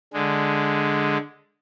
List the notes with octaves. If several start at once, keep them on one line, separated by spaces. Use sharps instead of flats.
D3 G#3